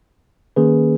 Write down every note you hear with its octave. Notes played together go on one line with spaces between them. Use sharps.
D#3 A#3 C#4 G#4 B4